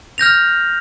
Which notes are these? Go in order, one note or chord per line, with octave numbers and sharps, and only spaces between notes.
F6 G6 A#6 F7